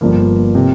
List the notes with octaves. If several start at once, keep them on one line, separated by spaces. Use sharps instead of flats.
G1 G2 F3 A#3
C3